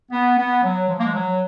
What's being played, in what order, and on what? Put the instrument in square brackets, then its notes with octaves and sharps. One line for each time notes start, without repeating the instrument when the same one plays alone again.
[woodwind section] B3
B3
F#3
F3
A#3
G#3
F#3